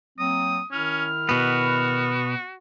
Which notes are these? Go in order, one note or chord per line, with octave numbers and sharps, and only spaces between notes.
F#3 A#3 C4 D#6
D#3 C#4 E4 F6
B2 B3 F#4